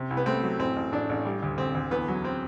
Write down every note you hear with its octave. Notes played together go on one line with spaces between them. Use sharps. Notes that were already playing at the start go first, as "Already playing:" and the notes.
Already playing: C3
C2
B3
A3 C4
F#3
A1 C4
A1
A1 D4
A1
G3
D2
D2 C4
D2
E2 B3
F#3
C4